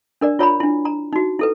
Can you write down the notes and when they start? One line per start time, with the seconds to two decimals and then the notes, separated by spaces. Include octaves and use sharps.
0.21 D4 A#4 D5
0.39 F4 C#5 A#5 B5
0.60 D4 E4
0.85 A#5
1.13 D#4 F#4
1.39 E4 A4 B4